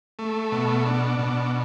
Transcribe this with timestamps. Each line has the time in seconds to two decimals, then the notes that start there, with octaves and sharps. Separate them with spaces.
0.19 A3
0.52 B2
0.86 D4
1.19 B2